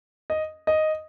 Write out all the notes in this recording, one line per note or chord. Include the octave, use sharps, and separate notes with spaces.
D#5
D#5